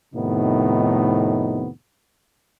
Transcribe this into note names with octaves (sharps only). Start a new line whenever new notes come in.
F2 A2 C3 D#3 B3 D#4